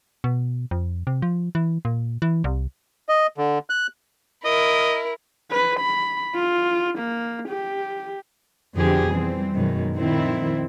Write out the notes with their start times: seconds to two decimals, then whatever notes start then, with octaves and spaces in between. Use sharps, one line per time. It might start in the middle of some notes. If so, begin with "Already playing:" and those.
0.24 B2
0.71 F2
1.07 C3
1.22 F3
1.55 E3
1.85 A#2
2.22 E3
2.44 C2
3.09 D#5
3.38 D3
3.70 F#6
4.44 E4 A#4 D#5
5.51 B4
5.80 B5
6.35 F4
6.98 A#3
7.49 G4
8.76 F2 B2 D3 C4 G4 G#4
9.10 E3 G3 C4
9.54 F#2 B2 D#3 G#3
9.97 F2 A#2 D#3 C4 E4